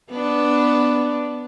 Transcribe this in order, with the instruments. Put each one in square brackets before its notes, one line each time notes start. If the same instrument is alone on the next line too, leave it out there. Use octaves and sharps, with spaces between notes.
[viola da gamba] B3 D4